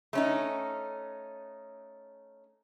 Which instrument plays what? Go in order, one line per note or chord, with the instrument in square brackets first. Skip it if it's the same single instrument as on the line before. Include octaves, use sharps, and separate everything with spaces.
[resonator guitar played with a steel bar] A3 C#4 D#4